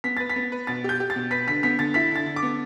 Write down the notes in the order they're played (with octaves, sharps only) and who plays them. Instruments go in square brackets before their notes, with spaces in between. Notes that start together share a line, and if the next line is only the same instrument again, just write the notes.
[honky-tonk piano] B3 [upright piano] B6
[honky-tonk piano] B4 [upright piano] A6
[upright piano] B6
[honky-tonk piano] B3
B4
[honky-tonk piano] B2 [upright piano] A6
[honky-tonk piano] G4 [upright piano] G6
[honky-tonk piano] G4
[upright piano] A6
[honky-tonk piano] B2
[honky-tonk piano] B4 [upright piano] B6
[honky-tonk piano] D3 [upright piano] B6
[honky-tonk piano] B3 [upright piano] B6
[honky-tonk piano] D3 [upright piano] A6
[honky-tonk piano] E4 [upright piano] B6
[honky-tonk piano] D3 [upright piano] A6
[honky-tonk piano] D3
[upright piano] D6
[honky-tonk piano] B3